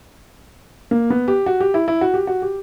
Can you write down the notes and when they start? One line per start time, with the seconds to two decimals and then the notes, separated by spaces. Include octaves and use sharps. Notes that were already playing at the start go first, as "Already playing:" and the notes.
0.91 A#3
1.10 B3
1.28 G4
1.46 F#4
1.60 G4
1.74 E4
1.88 E4
2.01 F#4
2.14 G4
2.27 F#4
2.42 G4